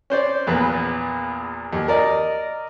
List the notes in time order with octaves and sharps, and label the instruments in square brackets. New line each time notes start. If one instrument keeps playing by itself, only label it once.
[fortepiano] C#4 C5 D5
A#1 E2 A#2 B4
D#2
A#4 D5 D#5